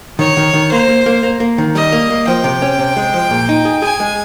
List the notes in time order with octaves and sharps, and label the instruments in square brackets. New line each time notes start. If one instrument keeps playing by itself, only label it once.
[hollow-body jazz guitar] D#3 [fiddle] C#5
[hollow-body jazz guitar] D#3
D#3
[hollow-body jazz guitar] A#3 [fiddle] C5
[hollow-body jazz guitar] A#3
A#3
A#3
A#3
D#3
[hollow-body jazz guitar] G3 [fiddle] D#5
[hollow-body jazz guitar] A#3
A#3
[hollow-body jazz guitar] F3 [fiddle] G5
[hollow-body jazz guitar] C3
C#4
C3
G#3
F3
A#2
D#4
G#4
[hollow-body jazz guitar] G#4 [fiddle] G#5
[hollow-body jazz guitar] G#3